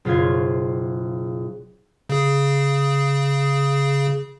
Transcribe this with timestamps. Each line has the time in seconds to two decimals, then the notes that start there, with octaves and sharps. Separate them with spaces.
0.05 F#1 B2 F4 C5 G#6
2.09 C#3 G#4